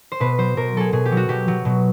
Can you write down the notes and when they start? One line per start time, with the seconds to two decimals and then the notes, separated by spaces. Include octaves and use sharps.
0.12 C5
0.20 B2 B4
0.38 F#3 C5
0.57 B2 A#4
0.75 F#3 G#4 A4
0.92 B2 G#4
1.05 G4
1.12 F#3
1.17 F#4
1.29 B2 G4
1.48 F#3
1.65 B2